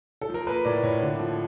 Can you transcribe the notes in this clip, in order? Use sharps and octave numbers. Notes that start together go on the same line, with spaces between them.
A4
F3
A#4
A#3 B4
A2 D5
A2 C#5
D3
F3